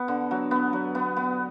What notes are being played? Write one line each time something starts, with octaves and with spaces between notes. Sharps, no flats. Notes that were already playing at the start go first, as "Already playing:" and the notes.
Already playing: B3
D3
F#3
B3
F#3
B3
B3